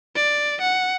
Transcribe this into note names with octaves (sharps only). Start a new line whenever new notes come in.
D5
F#5